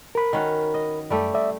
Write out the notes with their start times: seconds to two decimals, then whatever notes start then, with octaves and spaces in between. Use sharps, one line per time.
0.15 A#4 B5
0.33 D#3 C#4 F#4
0.74 D#5
1.10 F#2 G3 A3 G4
1.34 D5 E5